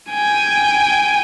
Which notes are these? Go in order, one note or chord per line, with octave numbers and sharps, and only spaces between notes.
G5 G#5